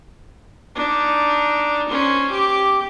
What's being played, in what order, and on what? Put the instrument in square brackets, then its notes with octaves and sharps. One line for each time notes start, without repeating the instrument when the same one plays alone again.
[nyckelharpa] D4 D#4
C#4 C5
G4 D6